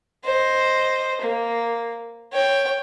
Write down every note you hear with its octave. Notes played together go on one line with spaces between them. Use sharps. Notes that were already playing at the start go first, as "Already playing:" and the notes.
C5 D#5
A#3
C#5 G5